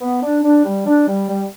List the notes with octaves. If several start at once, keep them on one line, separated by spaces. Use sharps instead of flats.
B3
D4
D4
G3
D4
G3
G3